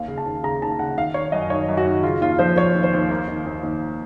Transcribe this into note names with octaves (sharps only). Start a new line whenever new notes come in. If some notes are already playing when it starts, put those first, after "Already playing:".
Already playing: D#2 D#3 F5
C#3
A5
D#2
C#3 A#5
D#2 A5
C#3 F#5
D#3 F5
D#3 C#5
F#2 D#5
D#3 C#5
F#2
F#4
D#3
C#3 F4
D#2 F4
F3 C5
F3 C#5
D#2
C5
D#2
A#3
D#3
D#2
D#2